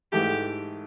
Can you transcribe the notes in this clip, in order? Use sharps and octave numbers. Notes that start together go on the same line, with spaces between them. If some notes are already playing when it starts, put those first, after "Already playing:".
G#2 E3 A3 G4